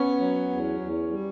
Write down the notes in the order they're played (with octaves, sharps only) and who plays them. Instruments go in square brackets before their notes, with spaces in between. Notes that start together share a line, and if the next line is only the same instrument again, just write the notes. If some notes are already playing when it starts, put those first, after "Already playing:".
Already playing: [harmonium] B3 [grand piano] C#4
[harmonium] F#3
E2
E2
G3